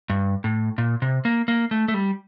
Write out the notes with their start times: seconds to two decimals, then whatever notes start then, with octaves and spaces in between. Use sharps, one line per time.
0.10 G2
0.44 A2
0.78 A#2
1.02 C3
1.25 A#3
1.48 A#3
1.71 A3
1.88 A3
1.94 G3